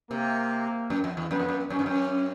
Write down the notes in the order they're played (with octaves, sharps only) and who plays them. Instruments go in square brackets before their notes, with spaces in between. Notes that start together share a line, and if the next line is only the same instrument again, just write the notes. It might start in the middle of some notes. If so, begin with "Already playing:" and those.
[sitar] C3 [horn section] A#3
[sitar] F#2
F2
E2
[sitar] F#2 [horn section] B3
[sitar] F2
F#2
[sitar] F#2 [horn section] C#4
[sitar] G2
F#2